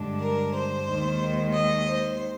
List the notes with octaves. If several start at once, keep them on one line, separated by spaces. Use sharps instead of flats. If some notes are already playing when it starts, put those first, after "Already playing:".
Already playing: G2 D3 G#3 D4
A#4
C5
D#2 D#3 G#3
D#5
C5